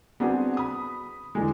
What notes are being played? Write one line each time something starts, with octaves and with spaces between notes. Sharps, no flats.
B3 C4 D4 F#4 G#4
B5 D#6
E2 D3 G#3